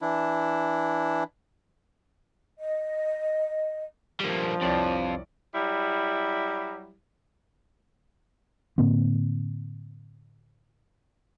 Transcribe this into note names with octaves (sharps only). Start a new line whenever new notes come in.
E3 D4 E4
D#5
G2 F3 G3 A#3
C2 F2 C#5 D5
F#3 G3 E4
A2 D3 A#3 C4